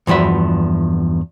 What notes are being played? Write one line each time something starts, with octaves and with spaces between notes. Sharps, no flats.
E2 G2 F3 F#4 E5